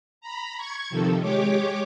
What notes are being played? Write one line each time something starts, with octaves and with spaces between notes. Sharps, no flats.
A#5 B5
C#6 G#6
C3 D#3 F3 A4
G#3 G4 C#5 D6